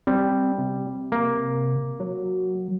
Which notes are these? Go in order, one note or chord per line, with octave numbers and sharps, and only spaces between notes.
G3 C4
C3
A#3
F#3